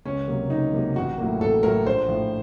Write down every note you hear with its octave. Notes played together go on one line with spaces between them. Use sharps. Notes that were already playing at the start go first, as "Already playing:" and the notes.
C#2 C#4
C3 F#3 A#3
C#2 D#4
C3 F#3 A#3
A1 F#4
A2 F#3 A#3
A1 A4
A2 F#3 A#3 A#4
A#1 C5
A2 F3